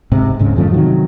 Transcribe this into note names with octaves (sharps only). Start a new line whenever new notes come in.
G#2 C3
D1 G#2 C#3
F2 D3 F3 A3
C3 D#3 F#3